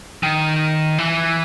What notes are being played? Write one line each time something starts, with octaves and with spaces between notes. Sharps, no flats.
D#3
E3